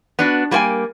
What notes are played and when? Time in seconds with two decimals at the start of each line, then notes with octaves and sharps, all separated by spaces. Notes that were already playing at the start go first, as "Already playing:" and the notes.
0.19 B3 D4 F#4
0.51 G3 A#3 F#4 C5 G5 G#5